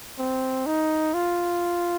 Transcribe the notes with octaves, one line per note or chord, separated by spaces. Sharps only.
C4
D#4
F4